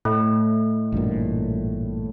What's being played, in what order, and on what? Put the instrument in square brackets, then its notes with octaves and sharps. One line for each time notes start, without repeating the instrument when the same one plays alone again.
[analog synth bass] A2 [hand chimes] A3
[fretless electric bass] A1 G2 A#2